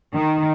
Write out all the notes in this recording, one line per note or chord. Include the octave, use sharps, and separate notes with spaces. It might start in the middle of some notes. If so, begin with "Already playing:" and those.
D#3